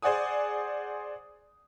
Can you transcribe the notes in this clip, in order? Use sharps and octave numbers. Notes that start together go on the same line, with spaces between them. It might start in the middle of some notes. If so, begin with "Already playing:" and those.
G#4 C5 D5 F#5 G#5 D#6